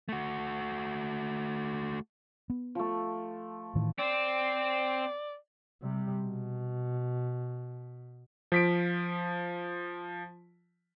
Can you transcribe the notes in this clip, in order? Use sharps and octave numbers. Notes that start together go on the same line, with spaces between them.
A3 F#4
B3
F3 A3
A2 D#3 E3
C4 D5
C3 G3
B2
F3 B6 D7